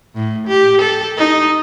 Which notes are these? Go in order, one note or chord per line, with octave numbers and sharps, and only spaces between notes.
A2
G4
A4
D#4